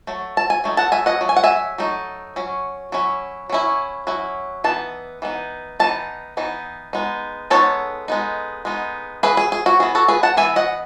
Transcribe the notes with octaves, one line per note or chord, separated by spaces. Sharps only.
F#3 A3
A5
G#5
F#3 A3 D#4
F#5 A5
E5 G#5
D#5 F#5
F#3 A3
G#5
F#5
E5 G#5
F#3 A3 D#4
F#3 C#4
F#3 C#4 E4
F#3 C#4 E4
F#3 C#4 E4
E3 B3 D#4 A5
E3 B3 D#4
E3 B3 D#4 A5
E3 B3 D#4
G#3 B3 D#4
G#3 B3 D#4 A4 C#5
G#3 B3 D#4
G#3 B3 D#4
E3 B3 E4 G#4 B4
G#4
G#4
F#4
E3 B3 E4 G#4
F#4 A4
G#4 B4
F#5 A5
E3 B3 E4 E5 G#5
D#5 F#5